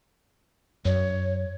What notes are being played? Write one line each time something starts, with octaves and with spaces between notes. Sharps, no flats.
F#2 C#5